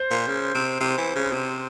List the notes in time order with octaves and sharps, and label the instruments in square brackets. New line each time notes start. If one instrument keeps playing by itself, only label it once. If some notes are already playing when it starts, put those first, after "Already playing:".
Already playing: [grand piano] C5
[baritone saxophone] A#2
C#3
C3
C3
E3
C#3
C3